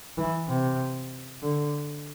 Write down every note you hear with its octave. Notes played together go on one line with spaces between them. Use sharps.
E3
C3
D3